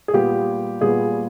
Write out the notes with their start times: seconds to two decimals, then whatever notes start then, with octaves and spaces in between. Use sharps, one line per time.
0.08 G#4
0.13 A#2 G3 B3 G4
0.81 A#2 G3 B3 G#4